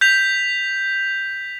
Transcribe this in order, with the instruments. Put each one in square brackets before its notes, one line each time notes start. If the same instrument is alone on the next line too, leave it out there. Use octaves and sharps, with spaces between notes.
[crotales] G6 B6 F7